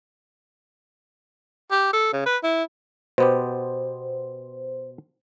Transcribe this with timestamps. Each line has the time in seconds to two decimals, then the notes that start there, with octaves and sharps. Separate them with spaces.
1.71 G4
1.93 A4
2.13 C#3
2.26 B4
2.43 E4
3.18 B2 B3 G4 C5